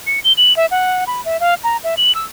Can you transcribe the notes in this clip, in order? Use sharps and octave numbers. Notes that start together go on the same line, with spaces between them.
C#7
G7
F#7
E5
F#5
B5
E5
F5
A#5
E5
F#7
E6